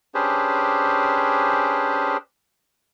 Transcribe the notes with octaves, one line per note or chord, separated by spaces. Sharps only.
C#4 D4 G4 G#4 B4 C5